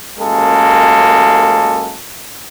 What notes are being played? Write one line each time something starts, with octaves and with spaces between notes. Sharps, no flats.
A1 F#2 G#3 A#3 A4